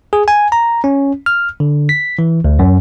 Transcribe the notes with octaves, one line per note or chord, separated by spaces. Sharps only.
G#4
G#5
A#5
C#4
F6
D3
B6
E3
D2
F#2